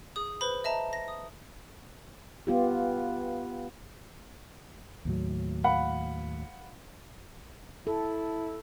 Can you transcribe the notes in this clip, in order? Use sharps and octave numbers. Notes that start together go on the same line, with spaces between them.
G#4 D#6
B4 C5 B5
D#5 E5 A5 A#5
A#6
D#6
B3 F4 G4
D#2 A2 F#3
F5 F#5 B5
E4 A4